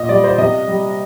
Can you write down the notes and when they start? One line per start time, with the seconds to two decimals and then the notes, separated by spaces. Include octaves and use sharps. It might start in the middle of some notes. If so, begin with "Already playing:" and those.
Already playing: A#2 D#5
0.09 G3 D5
0.24 C5
0.38 C3 D#5
0.68 G3